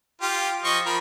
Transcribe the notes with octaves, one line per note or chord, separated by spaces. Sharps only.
F4 G4
F3 D#5 C#6
F3 A#4 B5